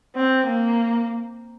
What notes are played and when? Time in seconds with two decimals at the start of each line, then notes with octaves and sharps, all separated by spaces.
0.16 C4
0.47 A#3